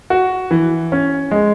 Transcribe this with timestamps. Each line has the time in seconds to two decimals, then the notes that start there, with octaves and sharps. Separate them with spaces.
0.10 F#4
0.51 E3
0.92 C#4
1.31 G#3